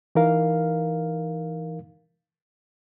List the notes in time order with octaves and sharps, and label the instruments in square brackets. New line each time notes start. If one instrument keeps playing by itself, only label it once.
[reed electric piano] E3 D#4 A#4 F5